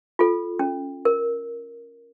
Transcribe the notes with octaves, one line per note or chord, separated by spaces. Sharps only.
F4 A4
C#4
A#4